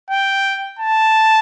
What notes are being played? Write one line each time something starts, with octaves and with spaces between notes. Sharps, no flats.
G5
A5